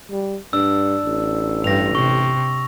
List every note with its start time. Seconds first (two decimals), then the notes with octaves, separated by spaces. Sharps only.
0.10 G3
0.53 G2 D4 E6
1.05 A1
1.64 G2 A#6 F7
1.95 C3 C#6